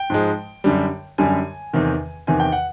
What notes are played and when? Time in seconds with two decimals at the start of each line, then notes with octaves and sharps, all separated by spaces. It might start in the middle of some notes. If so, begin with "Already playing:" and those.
Already playing: G5
0.10 G#2 F3 G#3
0.64 F#2 D3 G3
1.18 F#2 D3 G3 G#5
1.73 E2 C3 D#3
2.27 E2 C3 D#3 G#5
2.40 G5
2.52 F#5